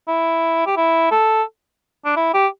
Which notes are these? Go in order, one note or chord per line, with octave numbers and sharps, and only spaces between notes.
E4
G4
E4
A4
D4
E4
G4